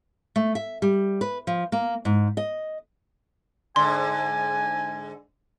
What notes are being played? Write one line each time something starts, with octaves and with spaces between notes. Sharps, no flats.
A3
E5
G3
B4
F3
A#3
G#2
D#5
G#2 D3 G#5 C6